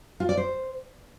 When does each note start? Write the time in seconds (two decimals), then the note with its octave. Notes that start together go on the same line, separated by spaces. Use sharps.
0.20 F4
0.29 D5
0.37 C5